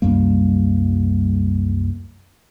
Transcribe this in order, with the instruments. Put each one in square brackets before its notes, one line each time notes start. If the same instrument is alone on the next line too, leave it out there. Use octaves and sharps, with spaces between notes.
[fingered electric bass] C2 F#2 G3 A#3